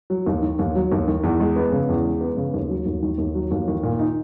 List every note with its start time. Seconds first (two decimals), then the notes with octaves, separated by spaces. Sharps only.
0.10 F#3
0.26 D#2
0.42 D#3
0.59 D#2
0.75 F#3
0.92 D#2
1.08 D#3
1.23 E2
1.40 G#3
1.56 B3
1.72 C#3
1.89 E2
2.05 G#3
2.21 B3
2.37 C#3
2.54 D#2
2.70 F#3
2.86 D#2
3.02 D#3
3.18 D#2
3.35 F#3
3.51 D#2
3.68 D#3
3.83 A#2
3.99 D#4